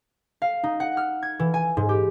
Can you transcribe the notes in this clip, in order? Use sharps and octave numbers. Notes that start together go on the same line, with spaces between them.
F5
D#4
F#5
F6
G#6
E3
G#5
G#2
G4